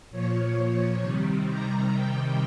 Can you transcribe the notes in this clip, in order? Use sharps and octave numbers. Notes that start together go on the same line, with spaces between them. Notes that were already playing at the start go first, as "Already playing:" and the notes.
A#2 F3 C#5
C3 D#3 G3
A#5
C3 D#3 G3 G5